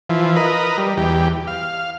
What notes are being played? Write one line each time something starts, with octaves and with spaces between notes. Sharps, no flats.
E3 F3
A#4 B4 D#5
G3
E2 G4
F5